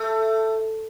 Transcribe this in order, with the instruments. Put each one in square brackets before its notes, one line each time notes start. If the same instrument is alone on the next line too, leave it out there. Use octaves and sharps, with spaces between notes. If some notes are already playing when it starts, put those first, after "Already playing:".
Already playing: [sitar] A3